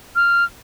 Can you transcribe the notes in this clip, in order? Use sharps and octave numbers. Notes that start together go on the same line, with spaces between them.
F6